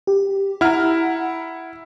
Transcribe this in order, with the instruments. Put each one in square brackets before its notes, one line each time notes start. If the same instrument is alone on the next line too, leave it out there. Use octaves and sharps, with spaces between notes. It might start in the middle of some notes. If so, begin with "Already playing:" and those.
[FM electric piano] G4
[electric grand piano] E4 F6 [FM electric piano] F#5 A#5